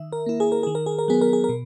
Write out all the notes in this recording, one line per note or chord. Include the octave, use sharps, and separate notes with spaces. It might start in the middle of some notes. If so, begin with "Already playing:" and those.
Already playing: D#3 E5
A#4
A#3 E4
G#4
A#4
D#3 G#4
A#4
G#4
A#4
F#3 B3 G#4
A#4
G#4
A#4
B2